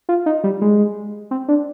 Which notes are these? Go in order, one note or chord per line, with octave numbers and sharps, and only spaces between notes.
F4
D#4
G3
G#3
C4
D4